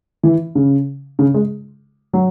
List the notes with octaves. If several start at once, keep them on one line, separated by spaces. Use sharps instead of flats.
E3
C#3
C#3
G#3
F#3